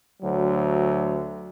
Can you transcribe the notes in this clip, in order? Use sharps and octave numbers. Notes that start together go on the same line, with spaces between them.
D2 F#3